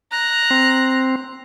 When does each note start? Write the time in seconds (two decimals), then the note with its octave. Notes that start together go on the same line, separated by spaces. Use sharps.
0.11 A#5 F#6
0.51 C4